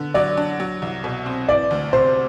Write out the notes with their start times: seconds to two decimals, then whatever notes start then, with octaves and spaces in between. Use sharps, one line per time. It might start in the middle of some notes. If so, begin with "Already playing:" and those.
Already playing: D3 B3
0.14 F#3 D5
0.37 D4
0.60 F#3
0.82 C2
1.04 B2
1.26 C4
1.48 E3 D5
1.71 D2
1.93 C3 C5